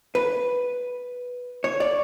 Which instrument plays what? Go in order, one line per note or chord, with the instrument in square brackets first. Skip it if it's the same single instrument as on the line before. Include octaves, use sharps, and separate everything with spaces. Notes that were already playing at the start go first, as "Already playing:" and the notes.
[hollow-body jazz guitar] B4
C#5
D5